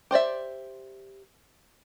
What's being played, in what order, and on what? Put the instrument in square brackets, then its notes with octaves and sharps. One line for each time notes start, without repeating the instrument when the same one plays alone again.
[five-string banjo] G4 C5 D5 E5